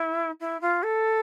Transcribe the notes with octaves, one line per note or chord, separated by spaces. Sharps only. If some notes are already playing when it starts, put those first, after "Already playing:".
Already playing: E4
E4
F4
A4